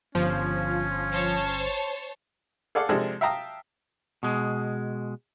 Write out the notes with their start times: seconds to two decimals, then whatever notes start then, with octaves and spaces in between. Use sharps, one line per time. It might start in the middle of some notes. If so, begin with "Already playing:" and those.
0.15 G1 F3 C#4
1.12 C5 C#5 A5
2.75 G#4 A4 D5 F5 F#5 D6
2.89 C3 F3 G#3 D4 G#4 A4
3.21 E5 F5 G5 A5 A#5 D#6
4.23 B2 G#3